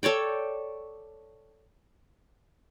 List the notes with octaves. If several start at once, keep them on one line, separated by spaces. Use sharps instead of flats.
A4 C#5 D5 G5